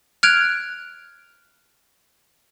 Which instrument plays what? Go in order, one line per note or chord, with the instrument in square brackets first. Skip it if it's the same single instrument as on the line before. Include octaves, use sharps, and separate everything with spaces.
[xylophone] F6 F#6 G#6 D7 F7